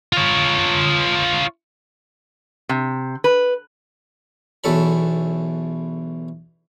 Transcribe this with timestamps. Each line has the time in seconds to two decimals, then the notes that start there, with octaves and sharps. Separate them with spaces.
0.13 F4 C#5
2.69 C3
3.24 B4
4.64 B1 E2 E3 A4 C#5 B5